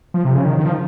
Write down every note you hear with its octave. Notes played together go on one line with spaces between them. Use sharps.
F3
C3
C#3
D#3
D#3
F3